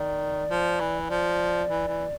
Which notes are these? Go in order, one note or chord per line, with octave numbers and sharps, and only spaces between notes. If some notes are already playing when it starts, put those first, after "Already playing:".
Already playing: D#3 D5
F3
E3
F3 D5
E3
E3